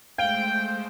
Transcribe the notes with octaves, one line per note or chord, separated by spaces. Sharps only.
G#3 A3 C5 F5 G5